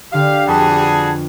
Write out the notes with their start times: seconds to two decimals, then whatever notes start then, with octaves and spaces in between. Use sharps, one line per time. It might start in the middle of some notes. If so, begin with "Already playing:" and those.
0.12 D3 G4 F5 E6
0.47 F2 G3 F#4 G#4 B4 A5 C6